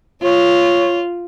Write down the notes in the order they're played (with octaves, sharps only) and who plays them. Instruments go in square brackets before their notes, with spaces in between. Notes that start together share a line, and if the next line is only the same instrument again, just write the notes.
[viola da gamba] F4 [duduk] C#5